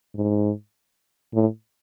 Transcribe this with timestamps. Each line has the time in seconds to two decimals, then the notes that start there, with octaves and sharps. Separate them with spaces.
0.15 G#2
1.34 A2